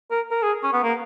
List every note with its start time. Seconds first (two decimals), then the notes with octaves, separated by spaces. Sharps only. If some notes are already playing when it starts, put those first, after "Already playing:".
0.11 A#4
0.31 A#4
0.42 G#4
0.63 C#4
0.73 B3
0.83 A#3